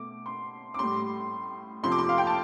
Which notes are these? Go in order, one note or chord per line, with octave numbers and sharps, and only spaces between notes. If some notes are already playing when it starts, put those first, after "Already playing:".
Already playing: B2 A3 D6
C6
D6
A2 G3 C6
F2 C3 F3 C6
D6
C6
F5
G5
A5